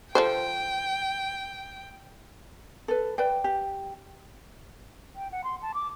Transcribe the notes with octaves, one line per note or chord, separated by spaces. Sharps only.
F3 A4 C5 G5
A4 B4
B4 D5 G5
G4
G5
F#5
C6
A5
D6